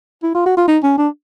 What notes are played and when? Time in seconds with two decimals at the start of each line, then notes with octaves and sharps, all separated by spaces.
0.23 E4
0.34 F4
0.46 F#4
0.57 F4
0.68 D#4
0.83 C#4
0.98 D4